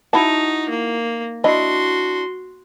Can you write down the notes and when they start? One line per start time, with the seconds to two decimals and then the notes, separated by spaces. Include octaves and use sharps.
0.13 D#4 E4 F#4 A5
0.69 A#3
1.44 D4 E4 F#4 D#5 C6